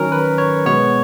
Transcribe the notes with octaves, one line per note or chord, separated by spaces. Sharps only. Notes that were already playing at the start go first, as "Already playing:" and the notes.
Already playing: D#3 F#3 C#4 A#4
B4
C#5
B2 G#3 B3 C#5